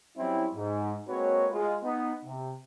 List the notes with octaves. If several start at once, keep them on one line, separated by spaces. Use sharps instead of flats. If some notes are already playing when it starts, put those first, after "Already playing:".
F#3 G3 C4 C#4 E4
G#2
G#3 A#3 C4 F#4 B4 C#5
G#3 F4
B3 D#4
C3